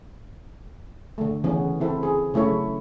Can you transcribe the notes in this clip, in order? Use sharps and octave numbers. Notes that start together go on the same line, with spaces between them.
D3 A3
C#3 E3 B3 C#4
C#3 C4 E4 A4
G#4
C#3 A3 E4 C#5
F#3